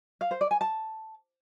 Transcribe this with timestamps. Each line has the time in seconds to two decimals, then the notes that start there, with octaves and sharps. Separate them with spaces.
0.21 F5
0.31 C5
0.41 D5
0.51 G#5
0.61 A5